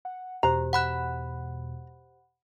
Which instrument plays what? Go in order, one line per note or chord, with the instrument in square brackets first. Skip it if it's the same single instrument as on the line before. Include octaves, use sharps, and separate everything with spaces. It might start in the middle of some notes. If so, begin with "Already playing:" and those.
[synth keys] F#5
[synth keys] E2 B2 [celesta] G4 C5 [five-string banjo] A#5
[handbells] F#5 B5 F#6